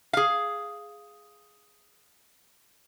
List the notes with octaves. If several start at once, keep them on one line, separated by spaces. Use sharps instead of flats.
G#4 F5